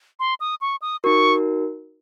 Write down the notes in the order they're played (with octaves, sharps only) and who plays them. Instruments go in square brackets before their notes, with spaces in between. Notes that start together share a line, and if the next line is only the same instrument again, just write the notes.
[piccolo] C6
D#6
C#6
D#6
[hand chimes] D#4 F#4 A#4 [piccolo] C#6